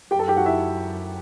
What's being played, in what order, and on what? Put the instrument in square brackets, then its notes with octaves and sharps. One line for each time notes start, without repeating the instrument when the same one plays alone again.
[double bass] F#2 [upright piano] G4 G5
[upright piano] A4 A5
G4 G5
F#4 F#5
E4 E5